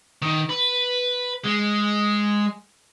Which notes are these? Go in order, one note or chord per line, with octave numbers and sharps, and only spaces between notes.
D#3
B4
G#3